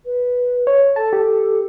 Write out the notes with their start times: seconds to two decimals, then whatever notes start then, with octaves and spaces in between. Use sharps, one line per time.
0.06 B4
0.67 C#5
0.96 A4 A5
1.13 G4